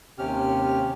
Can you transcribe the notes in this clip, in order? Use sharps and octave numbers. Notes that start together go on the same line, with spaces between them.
D#2 C3 C#4 G4 F6